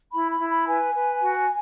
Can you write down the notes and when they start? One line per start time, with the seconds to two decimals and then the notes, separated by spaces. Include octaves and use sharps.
0.12 E4 B5
0.31 B5
0.40 E4
0.49 B5
0.67 B4 G#5
0.95 B4
1.21 F#4